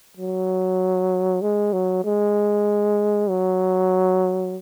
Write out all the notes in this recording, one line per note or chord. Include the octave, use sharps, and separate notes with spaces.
F#3
G#3
F#3
G#3
F#3